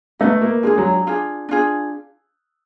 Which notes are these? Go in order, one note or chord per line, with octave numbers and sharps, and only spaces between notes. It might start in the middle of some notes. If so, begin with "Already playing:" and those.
A3 F#4 B4 D#5
A#3
G#3 D4 F4 G#4
F#3
D4 F4 G#4
D4 F4 G#4